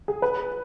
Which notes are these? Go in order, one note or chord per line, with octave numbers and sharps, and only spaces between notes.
G#4
B4